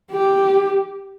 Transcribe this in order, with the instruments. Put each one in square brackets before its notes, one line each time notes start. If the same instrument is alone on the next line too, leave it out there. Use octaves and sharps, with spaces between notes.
[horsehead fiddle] G4